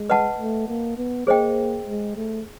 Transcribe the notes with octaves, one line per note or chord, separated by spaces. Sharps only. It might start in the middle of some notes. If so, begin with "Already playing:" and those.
Already playing: G#3
B4 D#5 F#5 A5
A3
A#3
B3
A#3 G#4 C5 D#5 G5
G#3
A3